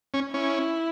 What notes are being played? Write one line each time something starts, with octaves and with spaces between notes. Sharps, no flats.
C#4
C#4 E4